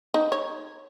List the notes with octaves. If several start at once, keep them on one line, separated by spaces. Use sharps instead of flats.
D#4
C#5